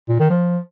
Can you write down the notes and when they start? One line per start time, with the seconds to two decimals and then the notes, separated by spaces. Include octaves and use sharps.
0.09 A#2
0.19 D#3
0.30 F3